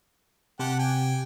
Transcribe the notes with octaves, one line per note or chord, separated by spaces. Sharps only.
C3 G4 F#5 A5
G5 G#5